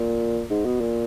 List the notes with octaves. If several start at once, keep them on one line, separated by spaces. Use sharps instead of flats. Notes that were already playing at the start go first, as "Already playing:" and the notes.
Already playing: A#2
G#2
B2
A#2